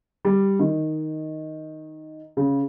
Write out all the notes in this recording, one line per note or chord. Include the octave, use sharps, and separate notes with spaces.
G3
D#3
C#3